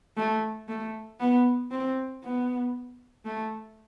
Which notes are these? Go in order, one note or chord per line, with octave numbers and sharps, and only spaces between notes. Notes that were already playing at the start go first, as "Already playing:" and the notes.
A3
A3
B3
C4
B3
A3